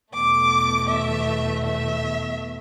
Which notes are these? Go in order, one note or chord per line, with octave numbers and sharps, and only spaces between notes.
E2 B2 A3 D6
E5
E5